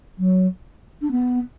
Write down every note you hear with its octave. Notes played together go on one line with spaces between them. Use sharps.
F#3
D4
B3